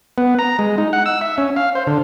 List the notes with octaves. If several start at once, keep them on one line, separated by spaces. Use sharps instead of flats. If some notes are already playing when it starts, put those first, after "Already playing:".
B3
A#5
G#3
D#4
F#5
E6
E5
C#4
F5
C5
D3